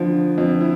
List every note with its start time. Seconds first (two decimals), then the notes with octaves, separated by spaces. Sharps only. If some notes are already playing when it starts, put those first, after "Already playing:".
Already playing: F2 D3 F3
0.38 F2
0.61 E4